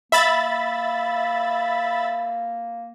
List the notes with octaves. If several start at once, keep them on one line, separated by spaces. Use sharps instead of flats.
A#3 E5 B5 A6